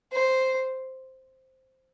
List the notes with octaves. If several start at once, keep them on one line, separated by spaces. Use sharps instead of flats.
C5